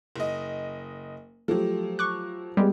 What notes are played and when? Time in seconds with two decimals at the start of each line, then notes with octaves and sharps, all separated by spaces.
0.16 F#1 D#5
1.48 F3 F#3 A3 G4
1.99 C#6 D6 F#6
2.57 G3 G#3 B3 G4 G#4